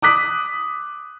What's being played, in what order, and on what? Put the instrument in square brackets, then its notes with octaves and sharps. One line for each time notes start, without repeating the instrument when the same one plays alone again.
[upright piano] D6 D#6 F#6 B6